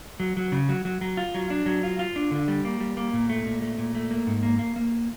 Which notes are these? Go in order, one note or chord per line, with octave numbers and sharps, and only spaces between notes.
F#3
F#3
C#3
F#3
F#3
F#3
F4
F#3
D4
F#3
F4
F4
D4
D3
G3
A#3
G3
A#3
A#2
A3
A#2
A3
A#2
A3
A#3
G#2
A#3
A#3
A#3